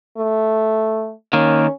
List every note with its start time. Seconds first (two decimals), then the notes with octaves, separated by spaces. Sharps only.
0.17 A3
1.33 D#3 A#3 C#4